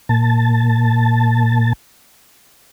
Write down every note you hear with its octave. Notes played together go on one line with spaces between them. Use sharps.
A#2 A5